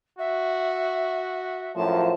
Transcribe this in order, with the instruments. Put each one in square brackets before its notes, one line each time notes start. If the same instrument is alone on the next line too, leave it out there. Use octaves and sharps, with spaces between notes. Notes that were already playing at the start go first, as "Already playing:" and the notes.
[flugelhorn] F#4 [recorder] E5
[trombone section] F#2 A2 F3 [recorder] A5